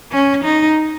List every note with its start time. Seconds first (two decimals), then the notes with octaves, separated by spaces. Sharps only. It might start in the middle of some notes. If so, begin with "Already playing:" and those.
0.12 C#4
0.44 D#4